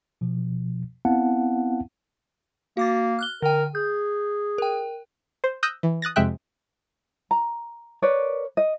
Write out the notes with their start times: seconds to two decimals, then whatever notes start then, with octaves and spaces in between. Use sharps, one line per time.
0.21 B2 F3
1.05 B3 C4 E4 F5 F#5 A5
2.77 A#3 F#4 D6 A6
3.19 F6 F#6 G7
3.42 D3 A#4 G5
3.75 G#4 G6
4.58 A#4 G5
5.44 C5
5.63 D#6 E6 F#6 G6 A#6 D#7
5.83 E3
6.02 D#6 F#6 A6 A#6
6.16 F2 C3 G#3 E5 G5 F#6
7.31 A#5
8.02 A#4 B4 C#5 D5
8.57 D#5